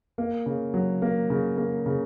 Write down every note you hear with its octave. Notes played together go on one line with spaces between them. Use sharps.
A#3
C#3
F#3
A#3
C#3
A#3
C#3